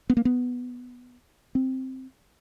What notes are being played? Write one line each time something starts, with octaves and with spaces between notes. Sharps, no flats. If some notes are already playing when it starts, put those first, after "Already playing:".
B3
A#3
B3
C4